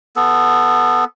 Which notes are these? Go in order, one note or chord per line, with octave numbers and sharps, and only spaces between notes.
B3 A4